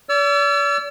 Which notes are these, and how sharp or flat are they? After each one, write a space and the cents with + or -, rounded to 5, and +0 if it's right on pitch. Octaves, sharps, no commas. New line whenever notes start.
D5 -45 E6 +35